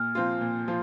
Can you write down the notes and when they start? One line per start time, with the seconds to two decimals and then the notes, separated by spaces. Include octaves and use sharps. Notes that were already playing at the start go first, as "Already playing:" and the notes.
Already playing: A#2 F6
0.15 F3 C4 F4
0.41 A#2
0.68 F3 F4